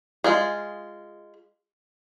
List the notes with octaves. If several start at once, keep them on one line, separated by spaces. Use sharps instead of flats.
G#3 F4 G#4